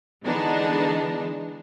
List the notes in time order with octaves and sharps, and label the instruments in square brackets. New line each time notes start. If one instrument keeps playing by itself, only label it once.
[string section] D3 E3 G#3 B3 D4 D#4